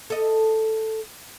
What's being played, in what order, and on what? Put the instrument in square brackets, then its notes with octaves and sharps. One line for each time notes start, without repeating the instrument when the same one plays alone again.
[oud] A4 D#5